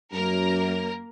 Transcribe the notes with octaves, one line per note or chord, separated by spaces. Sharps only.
F#2 A#3 A#4